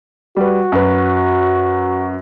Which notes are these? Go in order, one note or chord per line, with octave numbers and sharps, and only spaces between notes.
G3 F#4 B4
F#2 B4